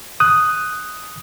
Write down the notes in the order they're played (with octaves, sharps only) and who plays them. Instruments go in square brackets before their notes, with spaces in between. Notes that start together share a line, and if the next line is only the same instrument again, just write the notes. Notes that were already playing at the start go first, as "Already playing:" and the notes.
[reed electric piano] D#6 F#6